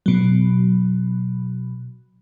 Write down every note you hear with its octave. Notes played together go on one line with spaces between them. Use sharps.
B2 F#3